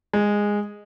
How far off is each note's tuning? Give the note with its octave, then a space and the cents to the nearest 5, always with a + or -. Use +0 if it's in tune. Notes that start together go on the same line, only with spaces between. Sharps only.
G#3 -10